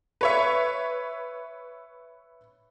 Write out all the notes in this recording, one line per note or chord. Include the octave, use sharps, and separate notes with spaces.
B4 C#5 E5